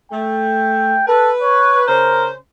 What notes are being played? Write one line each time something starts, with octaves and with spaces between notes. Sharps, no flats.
A3 G5
A4 B4
C#5
C#3 C#4 A#4 C5